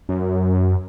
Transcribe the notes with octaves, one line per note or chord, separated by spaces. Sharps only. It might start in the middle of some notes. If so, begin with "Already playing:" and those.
F#2